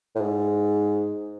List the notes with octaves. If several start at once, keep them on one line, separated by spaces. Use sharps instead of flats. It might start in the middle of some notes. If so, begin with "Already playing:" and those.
A2
G#2